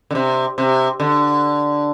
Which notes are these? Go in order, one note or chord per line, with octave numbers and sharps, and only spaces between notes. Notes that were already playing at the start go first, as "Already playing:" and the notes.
D3
C3
C3
D3